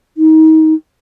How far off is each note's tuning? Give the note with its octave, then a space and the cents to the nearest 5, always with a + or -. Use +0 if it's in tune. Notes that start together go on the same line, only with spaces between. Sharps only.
D#4 +25